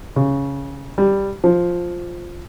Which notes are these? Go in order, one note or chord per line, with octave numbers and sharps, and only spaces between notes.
C#3
G3
F3